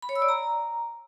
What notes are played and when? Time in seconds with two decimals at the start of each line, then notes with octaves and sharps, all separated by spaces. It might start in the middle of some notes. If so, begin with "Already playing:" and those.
0.02 B5
0.09 C#5
0.15 E6
0.22 D5
0.29 A#5